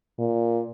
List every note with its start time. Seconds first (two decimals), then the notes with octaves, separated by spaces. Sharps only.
0.19 A#2